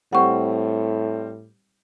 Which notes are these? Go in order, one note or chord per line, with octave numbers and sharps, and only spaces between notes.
A2 G3 C4 F#5 C#6